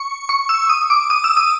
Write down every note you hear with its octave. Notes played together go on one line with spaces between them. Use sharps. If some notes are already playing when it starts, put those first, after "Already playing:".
Already playing: C#6
C#6
E6
D#6
D6
D#6
E6
D#6